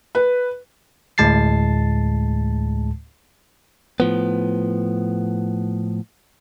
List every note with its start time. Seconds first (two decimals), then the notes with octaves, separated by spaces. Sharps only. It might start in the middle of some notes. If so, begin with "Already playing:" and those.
0.15 B4
1.18 D2 A2 G#3 A5 A6 C7
4.00 A2 F3 B3